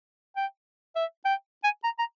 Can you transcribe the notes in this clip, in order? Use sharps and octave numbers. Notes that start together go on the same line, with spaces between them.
G5
E5
G5
G#5
A#5
A#5